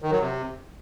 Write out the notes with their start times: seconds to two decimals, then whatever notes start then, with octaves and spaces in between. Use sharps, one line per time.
0.02 D#3
0.11 F#3
0.20 C3